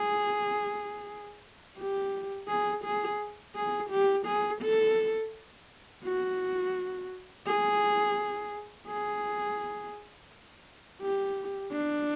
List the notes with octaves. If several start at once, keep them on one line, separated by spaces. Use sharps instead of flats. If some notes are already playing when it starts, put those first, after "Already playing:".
Already playing: G#4
G4
G#4
G#4
G#4
G4
G#4
A4
F#4
G#4
G#4
G4
D4